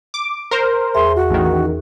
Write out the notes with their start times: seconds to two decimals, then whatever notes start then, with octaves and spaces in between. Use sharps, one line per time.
0.14 D6
0.51 A#4 C5
0.95 E2 G#4 E5 C6
1.16 F#4
1.30 A1 D#3